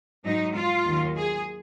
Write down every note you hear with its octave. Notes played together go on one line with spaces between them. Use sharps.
G#2 F#3 D#4
F4
D#2 D#3 F#3
G#4